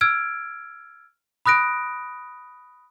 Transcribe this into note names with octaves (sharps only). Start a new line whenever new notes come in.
E6 F6 G#6 D7
B5 D#6 F#6 A#6 D7